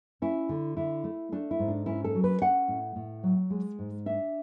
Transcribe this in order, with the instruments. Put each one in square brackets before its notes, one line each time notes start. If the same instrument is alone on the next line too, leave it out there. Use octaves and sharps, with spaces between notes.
[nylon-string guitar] C#4 E4
D3
D3 E4
A3
A3 D4
E4
G#2
D4
C#4 E4
A4
F#3
B4
C#4 F#5
A2
A2
F#3
G#3
G#2
D4 E5